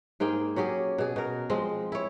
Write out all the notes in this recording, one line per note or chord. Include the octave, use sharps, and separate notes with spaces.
G#2 A#3 G#4 G5
F#3 C#4 G4 G#4
B2 G#4
B2 A#4
F3 G#3 C4
E4 C#5